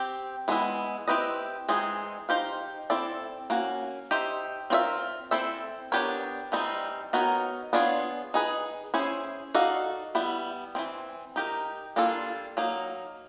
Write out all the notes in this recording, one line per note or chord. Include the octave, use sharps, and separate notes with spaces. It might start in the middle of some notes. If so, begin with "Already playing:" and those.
Already playing: C4 G4
E3 G#3 B3 E4
C4 E4 G4 B4 D#5
E3 G#3 C4 D#4 G#4
D#4 G4 C5 F5
C4 E4 A4 D5
A#3 C#4 F#4
D#4 G4 C5 E5
C4 F4 A#4 C#5 E5
C4 E4 A4 C5 E5
B3 D4 G4 A#4 C#5
E3 G3 C4 D#4
B3 D#4 F#4 A#4 C#5
B3 D4 F4 G#4 C#5
D#4 G#4 B4
C#4 E4 G#4 C5
D#4 F#4 A4 D5 F5
G3 B3 E4
E3 G#3 C4
D#4 G4 A#4
G3 A#3 D4 F4 A4
F#3 A#3 D#4